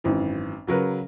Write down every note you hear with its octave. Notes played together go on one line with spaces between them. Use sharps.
G#1 F#2 E3
C#3 F#3 A#4 B4